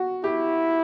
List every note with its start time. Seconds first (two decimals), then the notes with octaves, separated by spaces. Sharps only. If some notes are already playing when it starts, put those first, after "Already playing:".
Already playing: F#4
0.24 E4 G4